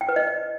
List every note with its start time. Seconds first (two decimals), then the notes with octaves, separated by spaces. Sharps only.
0.01 G5
0.09 B4
0.16 D#5